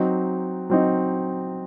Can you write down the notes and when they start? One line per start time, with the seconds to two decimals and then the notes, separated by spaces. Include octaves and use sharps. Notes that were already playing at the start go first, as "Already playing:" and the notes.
Already playing: F#3 C4 D#4
0.70 F#3 C4 D#4